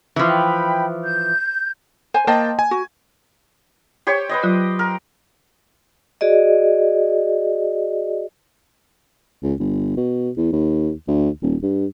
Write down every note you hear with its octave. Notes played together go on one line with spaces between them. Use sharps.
E3 F3
G5 B5
G6
C5 G#5
A#3 C5 D#5 G5 A5
G#5
F#4
G4 C5 C#5
B4 C5 D#5
F#3 F4 D5
A#4
F#4 G#4 D5 D#5
C#2
G1
B2
E2
D#2
D2
D#1
G2